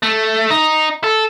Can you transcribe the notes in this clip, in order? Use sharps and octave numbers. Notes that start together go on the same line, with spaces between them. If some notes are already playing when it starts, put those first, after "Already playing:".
A3
D#4
A4